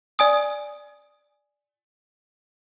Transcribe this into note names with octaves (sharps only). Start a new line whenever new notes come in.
D5 G#5 D#6